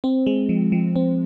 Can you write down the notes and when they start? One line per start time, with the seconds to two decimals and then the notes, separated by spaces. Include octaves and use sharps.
0.04 C4
0.27 G#3
0.49 F3
0.72 F3
0.96 C4